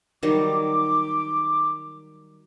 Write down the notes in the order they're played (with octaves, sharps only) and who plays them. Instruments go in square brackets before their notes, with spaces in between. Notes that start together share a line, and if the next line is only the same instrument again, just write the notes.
[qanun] D#3 F#3 G3 [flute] D6